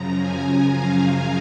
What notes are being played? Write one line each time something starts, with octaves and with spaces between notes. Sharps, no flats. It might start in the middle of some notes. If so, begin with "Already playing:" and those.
Already playing: F#2 C#3 F3 A#5
G#5
F5